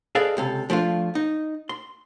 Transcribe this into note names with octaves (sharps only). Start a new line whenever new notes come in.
G#4 A4 B4 D5 D#5 F5
C#2 C3 A4
F3 A3 D4 F4
D#4
C6